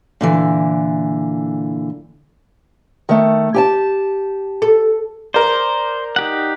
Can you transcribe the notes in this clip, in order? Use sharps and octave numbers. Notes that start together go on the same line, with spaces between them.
A#2 D3 E3
D#3 A3
G4 G#5 A5
A4
A#4 C5 D5
D#4 G4 F#5